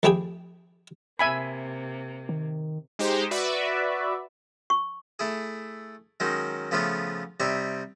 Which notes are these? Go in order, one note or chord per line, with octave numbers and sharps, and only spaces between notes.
F2 A3 E4 G4 G#4 G5
C3 A#3 E5 G#5 B5
D#3
G#3 D#4 G4 C5
F#4 B4 D5 E5
C#6
A3 E4 G#4
D#3 F#3 G#3 C#4 D#4
C#3 F3 A3 B3 F4 C#5
C3 G3 D#4 C#5 E5